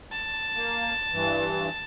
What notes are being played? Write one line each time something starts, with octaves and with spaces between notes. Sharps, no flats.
A5
A#3
G2 E3